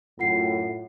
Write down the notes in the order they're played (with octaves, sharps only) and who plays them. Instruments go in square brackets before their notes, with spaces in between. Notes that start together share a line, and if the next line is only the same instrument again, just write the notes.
[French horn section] F#2 A2 [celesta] F4 F#5 C7